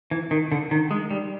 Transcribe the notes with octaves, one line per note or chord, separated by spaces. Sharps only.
E3
D#3
D3
D#3
G#3
G3